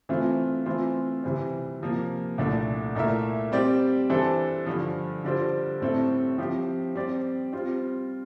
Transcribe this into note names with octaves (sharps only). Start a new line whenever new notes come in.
E3 A3 C4 F4
E3 A3 C4 F4
C3 E3 G3 C4
C3 F3 A#3
C2 A#2 A3 D4
A#2 A3 E4 A#4 E5
G3 C4 G4 D5
E3 G3 D4 A4 C5
G2 D3 F3
D3 G3 D4 F4 C5
A2 G3 C4 E4 A4
F3 C4 E4 G4
G3 C4 G4 D5
G3 C4 F4